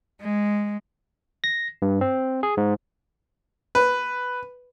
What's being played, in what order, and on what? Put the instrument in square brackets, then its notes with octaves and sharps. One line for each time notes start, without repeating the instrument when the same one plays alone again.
[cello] G#3
[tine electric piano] A#6
G2
C4
G#4
G#2
[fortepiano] B4